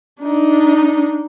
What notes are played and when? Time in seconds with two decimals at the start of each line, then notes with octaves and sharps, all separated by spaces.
0.22 D4 D#4